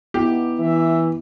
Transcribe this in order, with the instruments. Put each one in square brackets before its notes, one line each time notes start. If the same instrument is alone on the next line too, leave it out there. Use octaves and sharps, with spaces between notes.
[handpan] B3 D#4 E4 [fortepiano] G4
[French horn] E3 [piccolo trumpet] E5